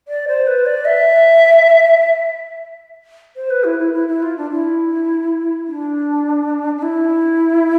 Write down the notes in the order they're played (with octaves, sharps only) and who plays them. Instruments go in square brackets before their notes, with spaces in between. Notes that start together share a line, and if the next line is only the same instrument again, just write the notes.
[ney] D5
C5
B4
D5
E5
C5
B4
E4
E4
E4
E4
F4
D4
E4
D4
D4
E4